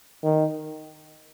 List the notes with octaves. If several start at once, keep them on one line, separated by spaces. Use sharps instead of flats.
D#3